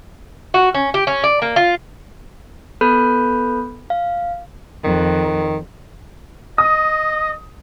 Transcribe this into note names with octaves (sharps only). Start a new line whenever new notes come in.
F#4
C#4
G4
C#4
D5
A#3
F4
B3 A4 B4 B5 F#6 G6
F5
F2 D#3
D#5 D#6